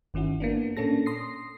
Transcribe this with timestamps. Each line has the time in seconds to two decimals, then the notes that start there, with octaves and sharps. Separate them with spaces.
0.14 G1 D#3 C#4 E4 F#4
0.40 A#3 B3 D4
0.77 A#2 A#3 C#4 D4 A4 A#6
1.06 C6 D#6 A#6 C7